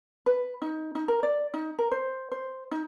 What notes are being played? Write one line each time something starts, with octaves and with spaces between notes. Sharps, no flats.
B4
D#4
D#4
A#4
D5
D#4
A#4
C5
C5
D#4